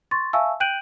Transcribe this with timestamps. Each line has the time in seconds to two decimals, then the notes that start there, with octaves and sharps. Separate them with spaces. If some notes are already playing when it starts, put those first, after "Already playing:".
0.11 C6 C#6 A6
0.33 E5 F5 G#5 A5 C#6 E6
0.60 G5 F#6 G6 D7 D#7 F#7